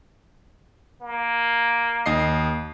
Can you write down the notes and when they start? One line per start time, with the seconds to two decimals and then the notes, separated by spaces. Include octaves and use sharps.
1.01 A#3
2.06 D#2 D#5 C7